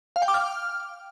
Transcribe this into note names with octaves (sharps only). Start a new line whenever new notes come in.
F5
G5
D6
F6